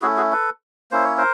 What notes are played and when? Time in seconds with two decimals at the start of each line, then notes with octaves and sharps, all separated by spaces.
0.02 A3 C#4 E4 F#4 G#4
0.17 F#4 G#4
0.32 A4 B4
0.91 A#3 C#4 E4 C5
1.04 C#5
1.17 A#4 C5